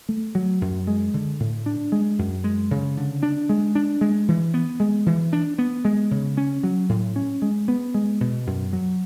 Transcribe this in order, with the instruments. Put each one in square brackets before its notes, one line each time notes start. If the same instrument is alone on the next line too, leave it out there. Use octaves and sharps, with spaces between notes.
[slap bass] A3
F#3
F#2
G#3
D3
A2
D4
G#3
F#2
G#3
C#3
D3
D4
G#3
D4
G#3
E3
B3
G#3
E3
D4
B3
G#3
C#3
C#4
F#3
A2
C#4
G#3
B3
G#3
B2
F#2
F#3